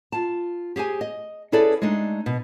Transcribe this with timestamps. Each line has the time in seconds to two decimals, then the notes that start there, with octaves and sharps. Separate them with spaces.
0.12 F4 A5
0.76 G4 G#4 C5 G#5
1.01 D#5
1.52 C#4 E4 G#4 A4 B4 D5
1.82 G#3 A3 D4 D#4
2.26 B2